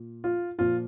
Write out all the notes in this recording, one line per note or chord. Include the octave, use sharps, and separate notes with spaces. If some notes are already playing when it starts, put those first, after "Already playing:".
Already playing: A#2
F4
A#2 F3 F4